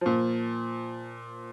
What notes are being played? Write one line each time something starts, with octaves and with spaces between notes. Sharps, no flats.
A#2 F3